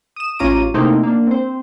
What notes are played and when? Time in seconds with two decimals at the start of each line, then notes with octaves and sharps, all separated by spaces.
0.16 D#6 E7
0.39 A1 C#4 F4 A#5 D6 D#7
0.74 C3 A3 A#3 C4 D#4 E4
1.03 A#3 D4
1.27 C4 C5